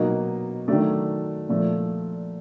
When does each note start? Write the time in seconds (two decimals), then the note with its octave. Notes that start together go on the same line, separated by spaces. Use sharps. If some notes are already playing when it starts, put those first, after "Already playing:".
Already playing: B2 F#3 A#3 D#4 D#5
0.68 D#3 F#3 A3 D4 D5
1.49 A#2 F3 A3